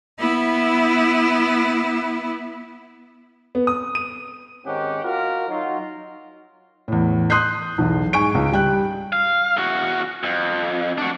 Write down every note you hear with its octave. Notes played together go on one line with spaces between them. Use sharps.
B3 E4
B3
D#6
D#7
G#2 D#3 C4 C#4 G4 F#5
F4 F#4 A#4
F#3 D#4 F4
E2 A2
C6 D#6 F#6 G6 C7
B1 E2
G#2 G#5 C#6 D7
C#2
G3 G5 F#6
F5
E2 F#4
F2
D4 F#4